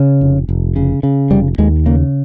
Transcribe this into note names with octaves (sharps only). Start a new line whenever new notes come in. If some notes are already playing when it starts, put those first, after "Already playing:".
Already playing: C#3
F1
F1
C#3
C#3
F1 G3
D#2 G#3
C#3 A#3